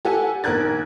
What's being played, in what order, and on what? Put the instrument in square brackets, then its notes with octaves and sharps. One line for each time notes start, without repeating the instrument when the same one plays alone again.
[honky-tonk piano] G4 A4 F#5 G#5
A#1 D#3 A#4 F#6 G#6 A6